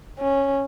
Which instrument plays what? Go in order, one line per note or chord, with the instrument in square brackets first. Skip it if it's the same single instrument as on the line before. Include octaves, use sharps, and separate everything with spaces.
[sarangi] C#4